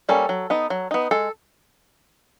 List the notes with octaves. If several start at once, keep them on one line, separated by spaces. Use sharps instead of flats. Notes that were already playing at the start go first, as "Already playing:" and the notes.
G3 A#3 C#4 A4
F#3
B3 D#4
F#3
B3 D#4
G#3 A4